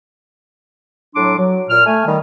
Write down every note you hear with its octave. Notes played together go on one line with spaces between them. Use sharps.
A2 F#3 D4 C6 D6
F#3
A#2 F6
A3 G#5
D#3 G3